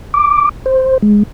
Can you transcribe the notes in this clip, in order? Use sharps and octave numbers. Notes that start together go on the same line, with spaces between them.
D6
C5
G#3